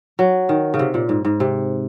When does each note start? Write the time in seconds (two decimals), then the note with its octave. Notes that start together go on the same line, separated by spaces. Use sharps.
0.19 F#3
0.49 D#3
0.74 C#3
0.79 C3
0.94 A#2
1.09 G#2
1.25 G#2
1.40 C3